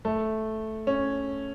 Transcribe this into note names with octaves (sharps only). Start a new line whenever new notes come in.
A3
C#4